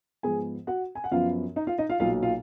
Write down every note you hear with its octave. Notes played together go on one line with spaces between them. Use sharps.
G#2 F3 G#3 B3 G#4 G#5
F#4 F#5
G#5
F#5
F#2 F3 B3 F4 F5
D#4 D#5
F4 F5
D#4 D#5
F4 F5
B1 A#2 F#3 F4 F5
F4 F5